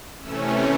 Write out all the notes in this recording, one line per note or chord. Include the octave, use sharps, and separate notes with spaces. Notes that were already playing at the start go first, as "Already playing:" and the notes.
C3 E3 A3 C#4 E6